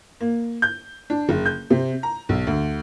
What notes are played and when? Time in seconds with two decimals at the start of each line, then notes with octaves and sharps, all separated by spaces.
0.21 A#3
0.62 G6
1.10 D4
1.29 F#1
1.46 G6
1.70 C3
2.03 A#5
2.29 B1
2.47 D2